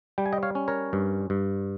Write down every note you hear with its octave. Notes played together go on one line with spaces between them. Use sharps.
G3 G5
G#5
D#5 G5
C#5 F5
C#4
A#4 C#5
G2
G2